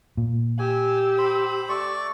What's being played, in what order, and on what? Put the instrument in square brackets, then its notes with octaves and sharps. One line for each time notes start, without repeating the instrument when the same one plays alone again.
[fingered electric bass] A#2
[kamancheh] G4 E6 [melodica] G#5
[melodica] C5 B5
A3 D5 C#6